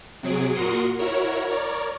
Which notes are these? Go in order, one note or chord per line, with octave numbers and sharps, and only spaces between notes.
C3 F#3 G#4 D7
A#2 F#4 A#4 C6 D#6 C#7
E4 F#4 A#4 C#5
A#4 C#5 D5